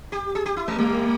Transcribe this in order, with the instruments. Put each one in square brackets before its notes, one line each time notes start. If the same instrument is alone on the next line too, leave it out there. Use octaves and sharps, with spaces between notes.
[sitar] G4
G#4
G4
E4
G#3
[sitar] G3 [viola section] A#3